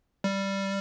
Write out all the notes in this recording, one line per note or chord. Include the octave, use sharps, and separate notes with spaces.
G3